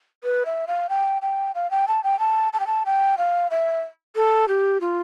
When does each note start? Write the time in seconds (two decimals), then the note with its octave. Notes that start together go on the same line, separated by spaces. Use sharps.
0.24 B4
0.46 E5
0.67 F5
0.89 G5
1.22 G5
1.55 F5
1.71 G5
1.88 A5
2.04 G5
2.19 A5
2.53 A5
2.60 G5
2.67 A5
2.86 G5
3.18 F5
3.51 E5
4.16 A4
4.48 G4
4.81 F4